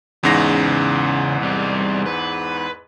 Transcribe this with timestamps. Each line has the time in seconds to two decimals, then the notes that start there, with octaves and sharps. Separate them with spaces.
0.23 E2 G#2 C#3 A#6
1.42 C2 G3
2.06 B4